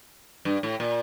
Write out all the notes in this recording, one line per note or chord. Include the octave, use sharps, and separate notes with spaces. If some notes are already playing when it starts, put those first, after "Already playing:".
G2
A2
A#2